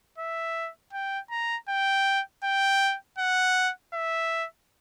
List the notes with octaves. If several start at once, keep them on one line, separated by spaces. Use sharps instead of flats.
E5
G5
A#5
G5
G5
F#5
E5